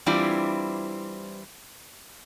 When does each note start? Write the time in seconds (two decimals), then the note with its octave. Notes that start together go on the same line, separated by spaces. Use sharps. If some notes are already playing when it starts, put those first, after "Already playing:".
0.06 E3 G3 C4 D4 E4 F4